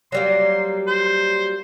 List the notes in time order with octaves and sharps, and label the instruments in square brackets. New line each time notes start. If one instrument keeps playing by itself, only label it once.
[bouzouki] F#3 G3 A#3 [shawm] C6
[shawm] C5